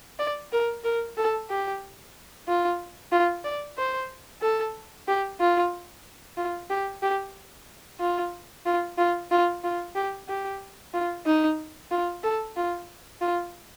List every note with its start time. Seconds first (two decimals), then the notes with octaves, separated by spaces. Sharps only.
0.19 D5
0.52 A#4
0.84 A#4
1.17 A4
1.50 G4
2.48 F4
3.12 F4
3.44 D5
3.77 C5
4.42 A4
5.08 G4
5.40 F4
6.37 F4
6.70 G4
7.03 G4
8.00 F4
8.66 F4
8.98 F4
9.31 F4
9.64 F4
9.95 G4
10.28 G4
10.93 F4
11.26 D#4
11.91 F4
12.23 A4
12.56 F4
13.21 F4